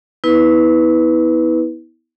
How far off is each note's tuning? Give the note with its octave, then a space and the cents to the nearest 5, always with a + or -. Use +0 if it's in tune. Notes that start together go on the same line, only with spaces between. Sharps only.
B3 +0 E4 -30 B4 +0